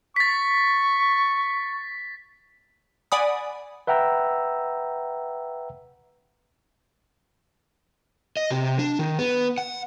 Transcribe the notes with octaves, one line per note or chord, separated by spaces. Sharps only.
C#6 A6 B6
D5 F#5 G#5 B5 D#6
B4 E5 F#5 G5 A#5 E6
D#5
C3
D4
D#3
B3
F#5